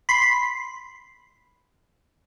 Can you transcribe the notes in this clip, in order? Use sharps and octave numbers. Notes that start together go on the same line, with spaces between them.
B5 C6